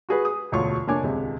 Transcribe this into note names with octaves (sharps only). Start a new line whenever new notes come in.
F#4 G#4 B4
D#6
E1 D2 F4 C#5 C#6
F1 A#3 D4 C#5 G#5 D6
D#1 C#2 C3